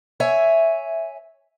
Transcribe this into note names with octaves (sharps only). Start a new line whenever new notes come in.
C#5 E5 G#5